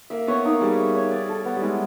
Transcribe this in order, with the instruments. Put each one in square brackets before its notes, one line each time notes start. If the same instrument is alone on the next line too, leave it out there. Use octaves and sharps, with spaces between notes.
[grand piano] A#3 [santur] E5
[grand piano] B3 [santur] C#5
[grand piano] A#3 [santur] D#4
[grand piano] G3 [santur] G#4
[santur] E5
C#5
D5
A4
B3
[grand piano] G3
[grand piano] G#3 [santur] E4